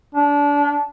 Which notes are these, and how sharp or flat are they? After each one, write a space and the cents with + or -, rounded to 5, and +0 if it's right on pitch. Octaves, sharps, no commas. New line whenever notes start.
D4 -25